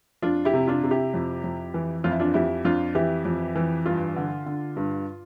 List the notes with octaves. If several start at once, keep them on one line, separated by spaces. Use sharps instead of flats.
F2 D4 F4
E4 G4
C3
D4 F4
C3
E4 G4
F2
F2
E3
F2 F4
E4
D4 F4
F2 E4 G4
F2 D4 F4
E3 E4 G4
F2
E3
G2 D4 F4
D3
D3
G2